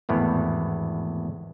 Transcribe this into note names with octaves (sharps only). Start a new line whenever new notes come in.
G#1 E2 A2 B3